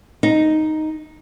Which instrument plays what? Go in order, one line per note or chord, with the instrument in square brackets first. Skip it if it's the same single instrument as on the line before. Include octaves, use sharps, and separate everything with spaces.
[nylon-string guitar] D#4